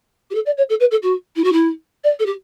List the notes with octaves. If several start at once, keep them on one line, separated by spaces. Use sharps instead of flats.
G4
A4
D5
C#5
A4
B4
A4
F#4
E4
F#4
E4
D5
A4
G4